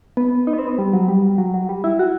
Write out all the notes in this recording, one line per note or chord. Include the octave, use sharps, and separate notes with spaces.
B3
D#4
B3
C4
B3
G3
F#3
G3
F#3
F#3
G3
E4
F#4